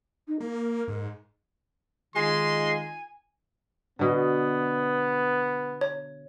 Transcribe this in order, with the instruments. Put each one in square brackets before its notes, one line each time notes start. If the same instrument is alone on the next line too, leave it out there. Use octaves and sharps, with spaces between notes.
[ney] D#4
[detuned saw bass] A#3 [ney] A#4
[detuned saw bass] G#2
[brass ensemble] D#3 D#4 F4 [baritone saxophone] G#3 [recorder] G#5 [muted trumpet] C6
[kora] B2 D3 [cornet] B3
[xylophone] C#5